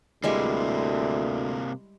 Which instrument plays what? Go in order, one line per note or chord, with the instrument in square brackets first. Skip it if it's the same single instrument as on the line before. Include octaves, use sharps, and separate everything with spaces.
[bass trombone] D2 [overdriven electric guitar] C3 A#3 [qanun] G3 G#3 E4